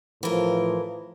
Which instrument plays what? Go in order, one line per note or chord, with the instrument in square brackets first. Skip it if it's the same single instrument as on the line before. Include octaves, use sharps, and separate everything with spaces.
[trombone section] A2 F3 [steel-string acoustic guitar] E3 A#4